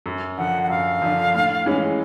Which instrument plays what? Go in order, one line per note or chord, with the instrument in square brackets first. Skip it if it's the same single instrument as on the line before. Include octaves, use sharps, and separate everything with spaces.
[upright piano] F#2
[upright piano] D3 F3 [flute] F#5
[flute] F#5
[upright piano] F#2 [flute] F5
[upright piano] D3 F3
A2
E3 G#3 C#4